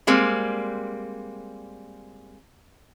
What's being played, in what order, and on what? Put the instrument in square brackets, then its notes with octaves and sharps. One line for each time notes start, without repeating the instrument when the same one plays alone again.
[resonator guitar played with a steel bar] G3 G#3 A#3 C4